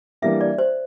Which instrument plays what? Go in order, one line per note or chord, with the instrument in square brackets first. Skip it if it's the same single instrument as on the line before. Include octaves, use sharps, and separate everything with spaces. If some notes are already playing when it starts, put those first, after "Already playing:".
[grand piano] E3 G3 A#3 D4 [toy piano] E5
[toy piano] D5
C5